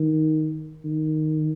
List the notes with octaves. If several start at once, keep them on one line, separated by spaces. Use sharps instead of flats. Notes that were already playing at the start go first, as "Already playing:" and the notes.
Already playing: D#3
D#3